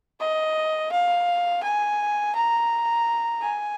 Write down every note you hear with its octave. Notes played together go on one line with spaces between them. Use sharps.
D#5
F5
G#5
A#5
G#5